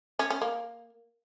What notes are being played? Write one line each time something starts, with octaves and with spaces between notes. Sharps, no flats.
C#4
C#4
A#3